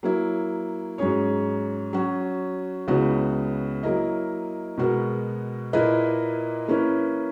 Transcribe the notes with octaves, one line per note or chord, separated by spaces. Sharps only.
F#3 A#3 E4
G#2 F#3 C#4 G#4 C#5
F#3 C#4 F#4
C#2 C#3 E3 B3 F#4
F#3 A#3 E4 A#4 D#5
B2 G#3 B3 F#4 A#4
A#2 A#3 E4 B4 D#5
E3 A#3 C#4 E4 B4